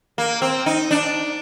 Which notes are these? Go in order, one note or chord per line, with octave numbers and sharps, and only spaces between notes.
A#3
C4
D#4
D4